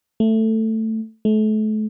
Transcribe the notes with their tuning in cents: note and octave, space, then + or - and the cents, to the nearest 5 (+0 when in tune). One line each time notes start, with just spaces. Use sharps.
A3 +10
A3 -35